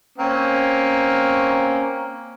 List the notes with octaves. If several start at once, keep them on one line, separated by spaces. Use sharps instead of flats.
A#3 C4 C#4